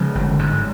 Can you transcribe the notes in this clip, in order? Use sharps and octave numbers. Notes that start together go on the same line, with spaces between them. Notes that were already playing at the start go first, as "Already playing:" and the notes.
Already playing: C#3 F3 G#3
G1
G#2